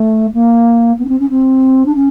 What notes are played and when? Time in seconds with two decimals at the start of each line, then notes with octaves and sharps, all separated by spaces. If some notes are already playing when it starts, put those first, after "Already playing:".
Already playing: A3
0.34 A#3
0.99 B3
1.05 C#4
1.09 C4
1.20 C#4
1.30 C4
1.86 D4
1.95 C#4